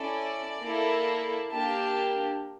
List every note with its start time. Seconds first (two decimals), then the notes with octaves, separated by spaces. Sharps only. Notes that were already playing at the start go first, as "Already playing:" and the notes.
Already playing: C#4 E4 A4 D5
0.62 A#3 E4 A4
1.50 A#3 D4 G4 A5